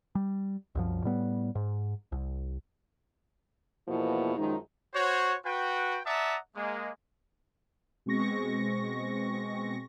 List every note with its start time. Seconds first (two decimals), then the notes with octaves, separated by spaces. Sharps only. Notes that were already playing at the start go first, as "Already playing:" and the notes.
0.15 G3
0.75 C2 F#2 F3
1.04 A2 G3 B3
1.55 G#2
2.12 C2
3.87 E2 B2 F3 A#3 E4
4.36 F#2 D#3 F3 G#3 D#4
4.94 F#4 C5 C#5
5.45 F#4 B4 G5
6.06 D5 E5 F#5 A5 A#5 D#6
6.55 G#3 A#3
8.06 B2 G#3 C4 C#6 A#6